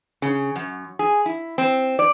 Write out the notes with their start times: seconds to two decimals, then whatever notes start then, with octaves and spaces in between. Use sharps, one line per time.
0.22 C#3
0.56 F#2
0.99 G#4
1.26 E4
1.58 C4
1.99 D5